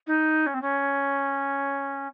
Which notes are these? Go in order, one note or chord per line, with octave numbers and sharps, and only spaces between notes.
D#4
C#4
C4
C#4